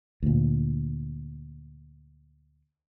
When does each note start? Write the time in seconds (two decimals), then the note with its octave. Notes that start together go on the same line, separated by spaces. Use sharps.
0.23 D2 A#2